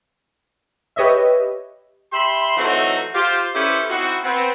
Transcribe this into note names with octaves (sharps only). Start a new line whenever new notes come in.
G4 B4 C#5 D#5 E5
G4 E5 B5 C6
E3 F#3 A3 C4 D#4 F#4
F4 G4 C5
C#4 E4 G4 A4 B4 C5
C4 D#4 E4 F#4
B3 C4